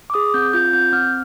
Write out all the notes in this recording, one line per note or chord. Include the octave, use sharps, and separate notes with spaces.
D6
G#4 D#6
C4 G6
F4 G6
C4 G6
C4 F6